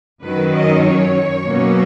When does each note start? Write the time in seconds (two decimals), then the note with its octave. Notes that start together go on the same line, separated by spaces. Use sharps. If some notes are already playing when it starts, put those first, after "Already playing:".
0.23 F#2 D#3 F#3 C#4 B4
0.53 D#5
0.85 C#5
1.47 B2 F#3 A#3 C#4